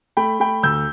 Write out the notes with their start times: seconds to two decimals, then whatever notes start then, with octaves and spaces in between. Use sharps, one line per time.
0.17 A3 G5 B5
0.40 A3 G5 B5
0.63 D2 E6 G6